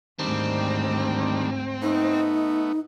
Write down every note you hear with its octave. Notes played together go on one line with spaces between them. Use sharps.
D2 G#2 D#3 G3 C4 D4
A3 B3 D#4